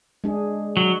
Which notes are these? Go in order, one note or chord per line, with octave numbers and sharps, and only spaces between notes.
G#3 D4 G#4
F#3